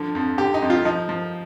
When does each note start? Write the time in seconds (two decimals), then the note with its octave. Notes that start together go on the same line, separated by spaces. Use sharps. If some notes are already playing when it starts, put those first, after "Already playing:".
Already playing: D3 F3
0.15 F2
0.38 D3 G4
0.54 D#4
0.62 F2
0.70 F4
0.85 F3 D#4
1.09 F3